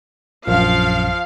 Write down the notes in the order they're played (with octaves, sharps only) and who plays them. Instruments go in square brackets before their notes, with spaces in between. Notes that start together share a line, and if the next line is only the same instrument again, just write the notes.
[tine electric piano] A#1 F#2 [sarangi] F3 [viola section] F5